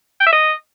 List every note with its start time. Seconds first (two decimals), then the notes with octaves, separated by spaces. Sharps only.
0.20 G5
0.26 E5
0.33 D#5